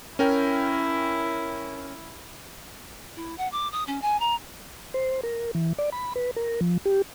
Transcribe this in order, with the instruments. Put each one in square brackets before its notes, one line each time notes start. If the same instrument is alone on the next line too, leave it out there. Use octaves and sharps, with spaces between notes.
[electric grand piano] C#4 A#4 G5 [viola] E4
[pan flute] E4
F#5
D6
D#6
C#4
G#5
A#5
[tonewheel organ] C5
A#4
E3
D5
B5
B4
A#4
F3
G4